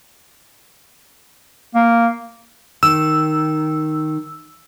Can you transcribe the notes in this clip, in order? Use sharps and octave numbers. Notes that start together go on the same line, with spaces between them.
A#3
D#3 E6